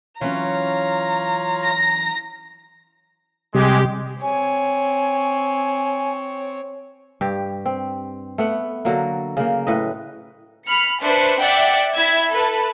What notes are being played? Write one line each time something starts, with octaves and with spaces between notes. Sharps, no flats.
E3 F#3 C#4 F4 C#5 F5 A#5
A#6
C3 G3 G#3 G4
C4 C#5 G#5
G2 G4
C4
A3 B3 F#5
D3 F#3 A#3
C#3 A#3
A2 B4 D#5
B5 F6 C#7
D4 B4 C5 E5 C#7
D5 E5 F#5 G5
E4 E5 G#6
A4 B4